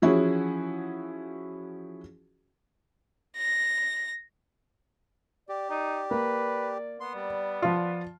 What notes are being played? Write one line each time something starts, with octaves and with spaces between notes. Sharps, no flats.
E3 F3 C#4 E4 F#4 G#4
A#6
G4 D5
D#4 D5
A#3 B4
B3 C6
G3 D5
F3 F4